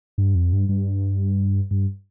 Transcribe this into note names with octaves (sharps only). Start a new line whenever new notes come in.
G2
F2
G2
G2
G2